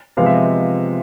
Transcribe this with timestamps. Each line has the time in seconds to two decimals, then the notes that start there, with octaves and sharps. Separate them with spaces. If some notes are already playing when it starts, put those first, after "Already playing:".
0.17 C3 F3 G#3 B3 F5
0.26 E5
0.34 D#5